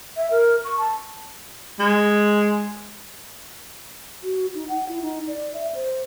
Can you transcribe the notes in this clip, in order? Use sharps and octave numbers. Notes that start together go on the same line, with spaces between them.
E5
A#4
C#6
A5
G#3
F#4
D#4
F#5
E4
D#4
D5
E5
C5